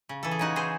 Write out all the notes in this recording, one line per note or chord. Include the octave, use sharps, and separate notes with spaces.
C#3
E3 A4
G#4
C#3 D#4 F#4
E3 G#4 C5